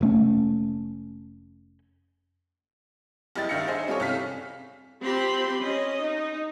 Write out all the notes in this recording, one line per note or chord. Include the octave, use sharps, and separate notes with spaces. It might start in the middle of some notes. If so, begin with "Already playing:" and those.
F1 A3 C#4
F#1 G3 E4 D#5 G5 A6
D#3 D4 E5 F5 A#6 C#7
D#4 G#4 C5 E5
G3 C4 F4 G#4 A4 C#5
C2 F2 C#4 F5 B6
C4 F4 G4 B5 C6
C#4 D#5
D#4